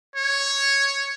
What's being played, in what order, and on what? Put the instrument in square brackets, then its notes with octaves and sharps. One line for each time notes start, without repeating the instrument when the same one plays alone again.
[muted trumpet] C#5